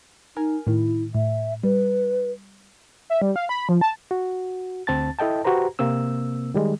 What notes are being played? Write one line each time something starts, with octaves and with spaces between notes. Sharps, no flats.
D#4 A#4 G#5 F6
A2 D#3 E4
A2 E5
G3 B4
E5
G3
F5
B5
F3
A5
F#4
D2 C4 A5 A6
E4 A4 D#5 G5 A5
F#4 G4 B4 C5 A#5
C3 A#3 C4 E6
D#3 G3 G#3